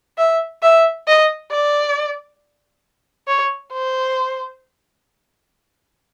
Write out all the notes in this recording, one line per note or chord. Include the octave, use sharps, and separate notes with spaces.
E5
E5
D#5
D5
C#5
C5